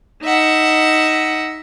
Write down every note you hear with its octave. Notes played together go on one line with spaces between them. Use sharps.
D#4 E5 F#5